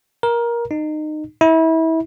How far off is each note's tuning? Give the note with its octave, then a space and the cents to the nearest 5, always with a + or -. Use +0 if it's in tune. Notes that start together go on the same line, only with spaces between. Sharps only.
A#4 +15
D#4 -25
E4 -30